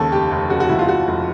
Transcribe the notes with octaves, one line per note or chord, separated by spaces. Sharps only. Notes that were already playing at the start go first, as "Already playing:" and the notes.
Already playing: D#2 C#3 A4
F1 G4
F1
C#3 F#4
F#4
D#2 E4
F4
F1 F#4
F1